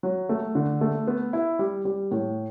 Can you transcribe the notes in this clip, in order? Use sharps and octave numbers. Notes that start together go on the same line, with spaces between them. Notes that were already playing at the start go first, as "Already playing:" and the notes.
F#3
A3
D3
A3
B3
E4
G3
G3
A2